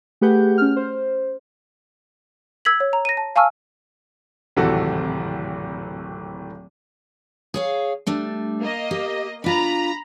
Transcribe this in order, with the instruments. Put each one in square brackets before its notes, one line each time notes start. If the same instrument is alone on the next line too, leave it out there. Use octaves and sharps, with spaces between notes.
[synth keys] A3 G4 G#4 B4 F#5 G6
C#4 F6
C5
[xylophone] E6 G#6 B6 F#7
C#5
A#5
A#6 D#7
A5
F5 G#5 A5 C#6 E6 F6
[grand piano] D1 G#1 C3 E3 F#4 A4
[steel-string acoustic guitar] G#4 C#5 F5
G3 A3 D4
[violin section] A#3 D#5
[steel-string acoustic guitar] G4
[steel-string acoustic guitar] D4 F4 [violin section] A#5 B5